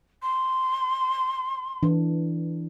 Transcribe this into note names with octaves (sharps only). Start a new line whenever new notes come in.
C6
E3 D4